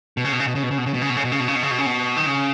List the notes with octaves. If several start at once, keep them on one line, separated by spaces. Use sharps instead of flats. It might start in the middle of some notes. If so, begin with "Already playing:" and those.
B2
C#3
B2
C#3
B2
C#3
B2
C#3
B2
C#3
B2
C#3
B2
C#3
B2
C#3
B2
C#3
B2
C#3
B2
C#3
B2
D#3
C#3